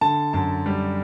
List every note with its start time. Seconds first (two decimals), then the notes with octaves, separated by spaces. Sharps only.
0.01 D3 A5
0.33 F#2 A5
0.66 G3